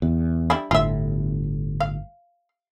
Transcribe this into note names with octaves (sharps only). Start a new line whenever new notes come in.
E2
G3 D4 E4
G1 A2 F4 E5
F5